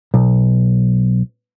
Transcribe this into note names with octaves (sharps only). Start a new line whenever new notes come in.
B1